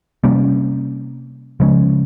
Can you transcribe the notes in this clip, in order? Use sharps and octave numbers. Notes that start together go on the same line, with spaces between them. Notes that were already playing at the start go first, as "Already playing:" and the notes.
C3 G3 A#3 C#4
C#3 F3 G#3 C#4